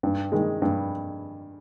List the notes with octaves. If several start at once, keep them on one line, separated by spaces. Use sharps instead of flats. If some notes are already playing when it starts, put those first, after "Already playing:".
G2
D#3 G#3
G2